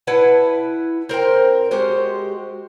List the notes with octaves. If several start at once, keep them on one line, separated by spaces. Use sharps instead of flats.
E4 B4 F#5 A5
C4 A#4 C5 G5
G#3 F#4 G4 C5